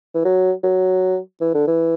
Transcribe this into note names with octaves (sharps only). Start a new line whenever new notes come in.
E3
F#3
F#3
E3
D3
E3